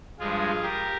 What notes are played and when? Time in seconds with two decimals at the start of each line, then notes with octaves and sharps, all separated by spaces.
0.19 G2 F3 G#3 F4 G#4
0.63 G4 A#4